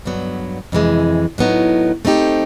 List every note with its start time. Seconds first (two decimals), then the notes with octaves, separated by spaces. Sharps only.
0.05 G2 D3 F#3 B3
0.72 F2 C3 E3 G#3
1.38 A2 F#3 B3 D#4
2.05 A3 C4 D#4 G4